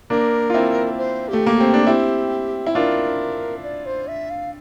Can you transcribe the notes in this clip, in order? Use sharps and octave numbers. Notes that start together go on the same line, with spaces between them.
A#3 D4 A#4
F4
C4 E4
C5
A3 G4
A#3
C4 G4
D4
C4 E4 G4
E4
D4 F4 A#4
D5
C5
E5
F5